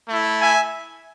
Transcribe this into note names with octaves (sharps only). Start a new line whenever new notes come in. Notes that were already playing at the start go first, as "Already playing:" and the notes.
A3 E4
E5 G#5